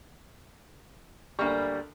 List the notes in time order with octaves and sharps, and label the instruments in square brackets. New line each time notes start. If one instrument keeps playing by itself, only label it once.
[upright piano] D2 A#4 C#6 [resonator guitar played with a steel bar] G3 A#3